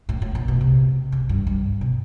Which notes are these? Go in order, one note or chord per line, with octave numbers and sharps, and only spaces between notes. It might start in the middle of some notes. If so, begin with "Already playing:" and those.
A2
A2
A#2
B2
C3
C#3
G2
G2
B2